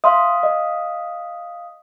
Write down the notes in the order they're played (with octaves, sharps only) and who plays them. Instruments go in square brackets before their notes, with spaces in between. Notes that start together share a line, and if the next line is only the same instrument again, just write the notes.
[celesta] E5 C6 [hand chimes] F5 D#6
[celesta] D#5